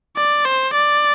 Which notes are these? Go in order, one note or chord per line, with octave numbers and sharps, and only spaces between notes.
D5
C5
D5